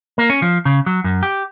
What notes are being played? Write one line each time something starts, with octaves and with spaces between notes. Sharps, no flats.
A#3
C#4
F3
C#3
F#3
F#2
G4